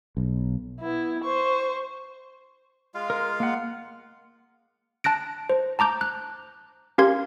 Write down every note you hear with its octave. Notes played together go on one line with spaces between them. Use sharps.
B1
B3 E4
C5 C#6
G#3 F4 F5
A#4
A#3 F#5
A5 F#6 A#6 D7
C5
A5 A#5 D6 G6
F#6
C#4 G4 A#4 F5 C6 G#6